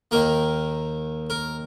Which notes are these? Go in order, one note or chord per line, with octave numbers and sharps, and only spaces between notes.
D#2 D#3 A#3 A#4
A#4